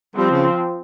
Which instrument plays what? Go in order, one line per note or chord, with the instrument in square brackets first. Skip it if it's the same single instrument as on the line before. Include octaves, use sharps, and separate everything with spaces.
[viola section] F3 C4 [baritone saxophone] G3
[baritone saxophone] C#3